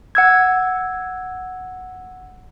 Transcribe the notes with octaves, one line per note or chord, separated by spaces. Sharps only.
F#5 E6 G#6